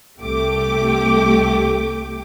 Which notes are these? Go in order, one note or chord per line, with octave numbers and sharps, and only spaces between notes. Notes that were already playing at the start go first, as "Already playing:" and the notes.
C2 A3 G4 D6